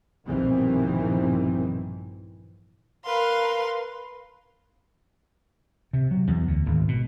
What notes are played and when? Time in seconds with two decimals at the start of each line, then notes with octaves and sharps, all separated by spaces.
0.26 A#1 G2 B2 D#3 E3 C4
3.04 A#4 B4 F5 C6
5.93 C3
6.11 F#3
6.27 E2
6.47 D2
6.66 G#1
6.88 B2